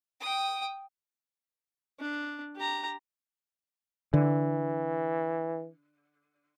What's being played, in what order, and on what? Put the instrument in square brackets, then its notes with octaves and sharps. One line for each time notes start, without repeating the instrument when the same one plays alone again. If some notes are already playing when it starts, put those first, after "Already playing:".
[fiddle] G5 D#6
[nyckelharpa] D4
G4 A#5
[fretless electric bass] D3 [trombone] E3